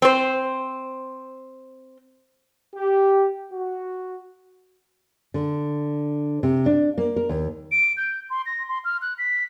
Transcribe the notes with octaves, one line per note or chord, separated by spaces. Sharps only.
C4 C5
G4
F#4
D3
C3
D4
A#3
A#4
D#2
D7
G6
C6
A#6
C6
F6
F#6
B6